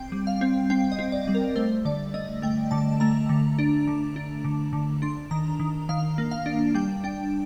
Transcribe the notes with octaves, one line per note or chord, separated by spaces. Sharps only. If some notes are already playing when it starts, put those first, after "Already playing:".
Already playing: C4 G5
G3
F5
C4
C4 G5
D#5
C4
D5
G3
A#4
A3 C5
D3 D5
A3 D#5
A3 G5
D3 A5
A3 A#5
D3
D4
D3
D4
D3
D3
D4 C6
D#3 A#5
D#3
D#3 F5
A#3
F5
D4
G3 G5
D4 G5